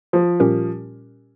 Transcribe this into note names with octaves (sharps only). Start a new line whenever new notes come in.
F3
A#2 G3 C#4 G4 A#4